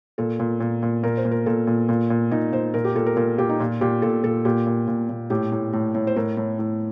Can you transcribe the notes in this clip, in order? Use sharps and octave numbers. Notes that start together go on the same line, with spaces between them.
A#2 A4
A#2
A#2
A#2
A#2 A#4
C5
A#2
A#4
A#2 A4
A#2
A#2
A#2
A#2 D#4
A#2 C5
A#2 A#4
G4
A#2 A4
A#4
A#2 A#4
A#2 G4
D#4
A#2 F4
A#2 G4
A#2 A4
A#2 A4
A#2 G4
A#2
A#2
A#2
A2 G4
A2
A2
A2
C5
A2 A#4
A2
A2